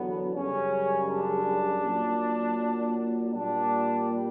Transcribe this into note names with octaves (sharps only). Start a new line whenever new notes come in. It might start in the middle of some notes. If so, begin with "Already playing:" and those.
Already playing: E2 D3 F#3 B3
F#2 C#3 G3 C#4
D4
A#2 F#3
A#2 G3 D4